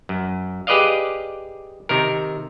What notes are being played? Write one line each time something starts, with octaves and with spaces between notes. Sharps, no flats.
F#2
G4 G#4 B4 D5 D#5 F5
C3 D#3 A#4